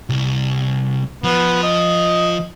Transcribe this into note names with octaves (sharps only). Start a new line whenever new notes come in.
C2
F3 B3
D#5